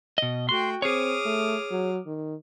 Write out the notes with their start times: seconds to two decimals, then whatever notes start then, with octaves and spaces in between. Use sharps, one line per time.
0.18 B2 D#5
0.49 A3 F#4 G5 C6
0.82 C4 G#4 C#5 D6 D#6 F6
1.25 A3
1.71 F#3
2.06 D#3